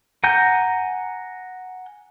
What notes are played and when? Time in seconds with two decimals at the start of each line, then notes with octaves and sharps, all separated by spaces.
0.24 F#5 G#5 A#5 G6